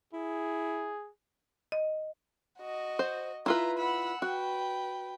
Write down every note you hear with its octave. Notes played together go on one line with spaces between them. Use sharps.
E4 G#4
D#5
F#4 D#5
C5
E4 F4 B4 A#5
F#5 B5 E6
F#4 B4 G5